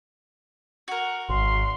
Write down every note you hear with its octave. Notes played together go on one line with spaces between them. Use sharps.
F#4 A#4
G#1 C6